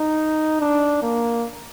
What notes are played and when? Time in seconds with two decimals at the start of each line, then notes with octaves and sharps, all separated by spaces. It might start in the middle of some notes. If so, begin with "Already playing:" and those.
Already playing: D#4
0.61 D4
1.03 A#3